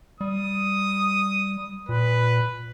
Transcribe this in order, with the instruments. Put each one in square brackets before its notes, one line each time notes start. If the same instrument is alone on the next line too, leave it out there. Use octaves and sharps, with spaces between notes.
[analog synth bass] G3 [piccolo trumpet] D#6
[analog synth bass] A#2 [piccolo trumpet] B4